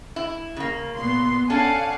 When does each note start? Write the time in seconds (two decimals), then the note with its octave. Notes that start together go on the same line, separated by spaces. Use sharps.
0.16 E4
0.56 C#3 A#3
0.97 A#2 B3 C6
1.50 C#4 D4 A4 F5 F#5 G#5